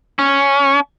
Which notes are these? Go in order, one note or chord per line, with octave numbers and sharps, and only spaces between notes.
C#4